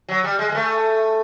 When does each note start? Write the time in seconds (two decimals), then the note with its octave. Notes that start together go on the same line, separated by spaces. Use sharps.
0.09 F#3
0.24 G3
0.39 G#3
0.49 G#3
0.55 A3